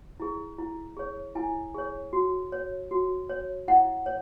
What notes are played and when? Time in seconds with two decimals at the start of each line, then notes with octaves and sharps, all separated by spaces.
0.20 E4 G#4
0.59 E4
0.97 G#4 C#5
1.35 E4 G#5
1.74 G#4 C#5
2.13 F#4
2.52 C#5
2.91 F#4
3.29 C#5
3.68 E4 F#5
4.06 C#5